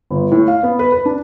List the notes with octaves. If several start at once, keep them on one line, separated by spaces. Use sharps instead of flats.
G1
A2
F5
B3
B4
B4
D4